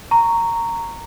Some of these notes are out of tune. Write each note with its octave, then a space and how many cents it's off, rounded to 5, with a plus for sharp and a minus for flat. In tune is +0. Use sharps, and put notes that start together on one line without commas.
A#5 -10 C#6 +0